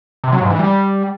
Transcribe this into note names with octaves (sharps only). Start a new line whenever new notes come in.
C3
F#3
G#2
E3
G3